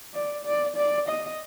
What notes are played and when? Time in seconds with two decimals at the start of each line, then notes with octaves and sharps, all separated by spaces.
0.14 D5
0.45 D5
0.77 D5
1.08 D#5